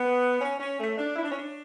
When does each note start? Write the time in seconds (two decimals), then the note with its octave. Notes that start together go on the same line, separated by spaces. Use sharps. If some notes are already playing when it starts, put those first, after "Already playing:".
Already playing: B3
0.41 C#4
0.60 C#4
0.79 A3
0.97 D4
1.16 E4
1.23 D4
1.31 C#4
1.38 D4